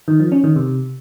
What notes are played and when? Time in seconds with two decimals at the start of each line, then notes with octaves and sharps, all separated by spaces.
0.08 D#3
0.20 F3
0.32 C#4
0.44 D#3
0.56 C3